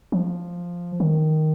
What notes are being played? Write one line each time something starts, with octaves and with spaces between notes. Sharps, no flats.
F3
D#3